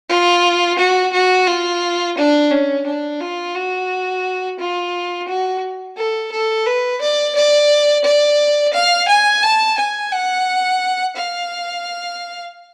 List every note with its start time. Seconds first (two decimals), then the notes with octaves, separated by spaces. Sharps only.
0.10 F4
0.78 F#4
1.13 F#4
1.47 F4
2.17 D4
2.52 C#4
2.86 D4
3.21 F4
3.55 F#4
4.59 F4
5.28 F#4
5.97 A4
6.32 A4
6.66 B4
7.01 D5
7.36 D5
8.05 D5
8.73 F5
9.09 G#5
9.43 A5
9.78 G#5
10.12 F#5
11.16 F5